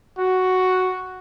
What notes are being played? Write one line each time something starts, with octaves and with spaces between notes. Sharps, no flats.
F#4